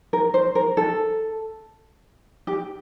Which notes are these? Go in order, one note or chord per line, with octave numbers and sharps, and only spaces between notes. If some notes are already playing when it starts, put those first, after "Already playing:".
A#4
C5
A#4
A4
G4